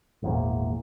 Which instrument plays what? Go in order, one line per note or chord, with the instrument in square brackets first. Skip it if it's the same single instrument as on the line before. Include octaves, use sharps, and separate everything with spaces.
[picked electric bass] G#1 E2 A#2